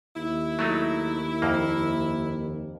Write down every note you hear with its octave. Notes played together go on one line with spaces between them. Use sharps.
D#2 E4
F#3 A3 D#4
F2 A#3